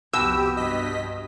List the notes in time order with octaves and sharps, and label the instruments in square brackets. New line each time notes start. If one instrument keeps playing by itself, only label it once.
[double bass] C2 F2 [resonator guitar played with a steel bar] B2 [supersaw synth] G4 [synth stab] E6
[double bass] G2 [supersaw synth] D#5 B6